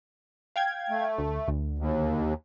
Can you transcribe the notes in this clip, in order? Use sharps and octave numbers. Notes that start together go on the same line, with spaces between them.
F5 G5 G#6
A3
D2
D2
D#2